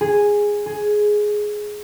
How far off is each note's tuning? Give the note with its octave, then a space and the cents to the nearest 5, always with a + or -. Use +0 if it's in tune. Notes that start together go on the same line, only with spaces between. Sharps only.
G#4 -5
G#4 +10